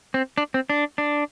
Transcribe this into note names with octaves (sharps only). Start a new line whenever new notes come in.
C4
D4
C4
D4
D4